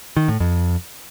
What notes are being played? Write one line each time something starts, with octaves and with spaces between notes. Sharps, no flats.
D#3
A2
F2